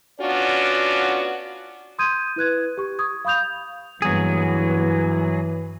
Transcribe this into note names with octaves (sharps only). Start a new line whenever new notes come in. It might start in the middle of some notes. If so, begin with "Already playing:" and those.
B3 C#4 D4 F4 F#4 D5
C6 D#6 G6 G#6 D#7
E4 B4 F#6 G#6
G4 C#6
C#6 D#6 G#6
F5 B5 D#6 G6 F7
G2 E3 F#3 A#3 B3 G#4